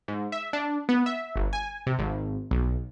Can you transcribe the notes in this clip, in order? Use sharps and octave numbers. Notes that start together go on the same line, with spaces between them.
G#2
E5
D4
B3
E5
G1
G#5
C3
G#1
B1